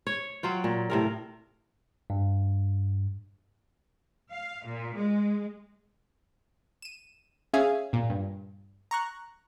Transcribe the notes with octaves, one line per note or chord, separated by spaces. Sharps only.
C#5
F#3 F4 G5
A#2
A2 C3 A#4
G2
F5
A#2
G#3
D#7 E7
C#4 G#4 E5 F5 G#5
A#2
G2
A#5 C#6 F#6